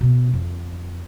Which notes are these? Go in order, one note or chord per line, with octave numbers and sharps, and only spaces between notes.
B2 B3
F2